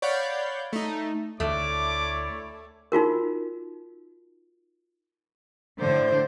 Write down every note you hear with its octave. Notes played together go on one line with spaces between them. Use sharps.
C#5 D5 F5 F#5 B5 G6
A3 D#4
D2 A3 E4 C#5 D5 D6
D#4 F4 F#4 A#4
A2 D3 C5